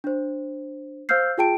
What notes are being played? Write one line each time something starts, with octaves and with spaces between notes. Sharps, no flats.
D4 C5
C5 F5 E6 F6 G6 C7
F4 G#4 G5 A5 D7